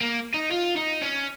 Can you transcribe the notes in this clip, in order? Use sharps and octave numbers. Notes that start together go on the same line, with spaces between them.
A#3
D#4
F4
D#4
C#4